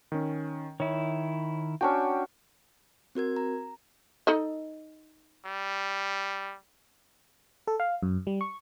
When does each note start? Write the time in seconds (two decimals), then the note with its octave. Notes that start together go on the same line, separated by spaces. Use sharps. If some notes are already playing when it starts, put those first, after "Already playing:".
0.12 D#3 C#4
0.80 D#3 E4 C#5
1.81 C#4 D4 F#4 G5
3.15 C4 F#4 A#4 G#6
3.36 A#5
4.27 D#4 A4 D#5
5.45 G3
7.67 A4
7.80 F5
8.03 F#2
8.27 G3
8.41 C#6